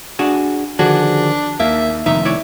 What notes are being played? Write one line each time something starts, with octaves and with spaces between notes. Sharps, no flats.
D4 F#4 G#4
D3 D#3 F3 D4 F#4 G#4
D#2 A#3 E5
F1 D#3 D#4 E5
E4 C#5 D5